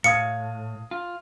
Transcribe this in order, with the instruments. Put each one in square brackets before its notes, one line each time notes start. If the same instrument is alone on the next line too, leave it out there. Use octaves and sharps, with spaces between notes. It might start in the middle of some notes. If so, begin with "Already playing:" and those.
[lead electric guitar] A2 [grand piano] F5 D#6 G#6 [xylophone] C#7
[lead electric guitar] F4